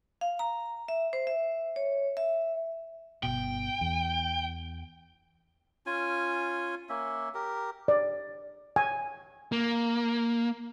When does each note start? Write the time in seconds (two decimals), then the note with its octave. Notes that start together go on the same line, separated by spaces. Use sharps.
0.21 F5
0.39 A#5
0.88 E5
1.13 C5
1.27 E5
1.76 C#5
2.17 E5
3.23 G1 B2 G5
3.81 E2
5.86 C#4 F4 G#5
6.89 A#3 C#4 E5
7.34 G4 A#4
7.88 D5
8.76 G#5
9.52 A#3